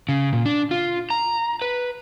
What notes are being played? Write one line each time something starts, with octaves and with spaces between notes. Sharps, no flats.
C#3
A#2
D4
F4
A#5
B4